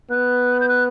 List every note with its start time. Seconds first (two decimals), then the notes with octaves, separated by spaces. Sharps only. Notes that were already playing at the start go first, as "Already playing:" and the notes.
0.11 B3 F#6
0.60 G6
0.69 F#6